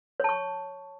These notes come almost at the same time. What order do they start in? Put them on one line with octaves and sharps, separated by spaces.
C#5 A5 C#6